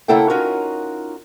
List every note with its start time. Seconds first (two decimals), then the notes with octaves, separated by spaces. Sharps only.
0.08 C#3 A#3 E4 A4 F#5 G5
0.30 C#4 D#4 F4 F#4 A#4